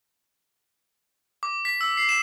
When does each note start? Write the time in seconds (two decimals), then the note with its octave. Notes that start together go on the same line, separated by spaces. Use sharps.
1.43 D6
1.65 B6
1.81 E6
1.97 C7
2.09 E7